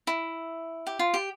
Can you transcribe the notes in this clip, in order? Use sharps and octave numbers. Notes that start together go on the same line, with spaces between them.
E4
G4
F4
G4